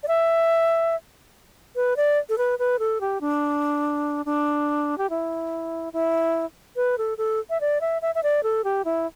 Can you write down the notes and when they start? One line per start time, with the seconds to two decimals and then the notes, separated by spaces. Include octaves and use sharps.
0.03 D5
0.08 E5
1.76 B4
1.97 D5
2.29 A4
2.38 B4
2.59 B4
2.79 A4
3.01 G4
3.21 D4
4.26 D4
4.98 G4
5.10 E4
5.93 E4
6.76 B4
6.98 A4
7.18 A4
7.50 E5
7.61 D5
7.81 E5
8.02 E5
8.15 E5
8.23 D5
8.43 A4
8.64 G4
8.85 E4